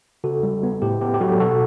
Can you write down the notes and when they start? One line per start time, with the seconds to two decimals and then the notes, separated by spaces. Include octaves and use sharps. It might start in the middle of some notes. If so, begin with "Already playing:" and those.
0.24 C#3 F#4 A4
0.43 G3
0.63 B3
0.82 A2 G4
1.01 B3 G4
1.14 G4
1.21 F#3 F#4 A4
1.40 B2 F#4 A4